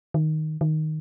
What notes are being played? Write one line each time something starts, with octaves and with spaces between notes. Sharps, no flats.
D#3
D#3